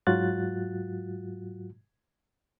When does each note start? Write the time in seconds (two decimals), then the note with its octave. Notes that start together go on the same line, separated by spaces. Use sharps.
0.07 G#2 F#3 F4 F#4 F#6 A6